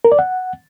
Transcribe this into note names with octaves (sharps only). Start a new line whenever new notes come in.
A#4
D5
F#5